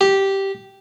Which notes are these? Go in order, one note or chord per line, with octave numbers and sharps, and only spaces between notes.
G4